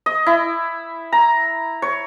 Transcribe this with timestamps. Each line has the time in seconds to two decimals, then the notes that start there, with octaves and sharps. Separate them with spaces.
0.06 D#5
0.26 E4
1.12 A#5
1.82 C#5